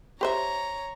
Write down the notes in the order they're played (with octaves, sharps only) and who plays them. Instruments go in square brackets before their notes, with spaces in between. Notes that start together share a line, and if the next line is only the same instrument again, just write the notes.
[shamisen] G4 C5 E5 [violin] C#5 A#5